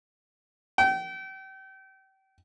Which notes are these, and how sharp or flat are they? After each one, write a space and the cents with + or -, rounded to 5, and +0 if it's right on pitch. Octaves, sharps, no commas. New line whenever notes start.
G5 -35